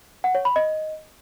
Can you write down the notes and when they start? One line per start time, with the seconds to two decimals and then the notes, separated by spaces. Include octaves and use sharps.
0.24 F#5
0.35 C#5
0.45 B5
0.56 D#5